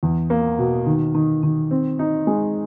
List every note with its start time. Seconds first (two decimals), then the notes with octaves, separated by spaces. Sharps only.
0.03 E2
0.30 A#3
0.58 B2
0.86 D#3
1.15 D#3
1.43 D#3
1.71 C4
1.99 D#4
2.27 G#3